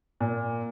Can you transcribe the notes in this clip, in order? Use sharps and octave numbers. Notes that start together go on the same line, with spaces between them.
A#2